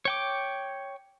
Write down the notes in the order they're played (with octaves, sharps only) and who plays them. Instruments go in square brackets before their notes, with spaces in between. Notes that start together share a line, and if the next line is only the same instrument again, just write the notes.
[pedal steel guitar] C#5 G5 D6